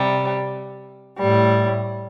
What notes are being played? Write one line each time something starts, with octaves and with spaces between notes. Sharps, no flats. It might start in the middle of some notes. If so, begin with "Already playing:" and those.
Already playing: C3 G3
A2 G3